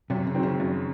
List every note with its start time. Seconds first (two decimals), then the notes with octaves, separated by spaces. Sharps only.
0.10 F#2 C3
0.27 C#3
0.35 D#3 F#3 C4
0.43 C#3
0.60 F#2